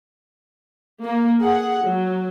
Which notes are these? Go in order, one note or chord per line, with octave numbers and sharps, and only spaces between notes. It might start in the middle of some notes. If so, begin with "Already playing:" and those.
A#3
G#4 F#5
F#3